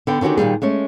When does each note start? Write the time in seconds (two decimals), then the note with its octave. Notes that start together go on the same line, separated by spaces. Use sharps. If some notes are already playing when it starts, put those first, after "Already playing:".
0.07 D3 B3 G5
0.21 D3 D#3 C#4 F#4 G4
0.37 A#2 D#3 G3 G#4
0.62 G#3 A3 C#4